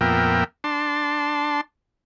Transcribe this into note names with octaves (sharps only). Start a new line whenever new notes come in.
F2 A#2 B3 A#4 E5 G5
D4 A5 C6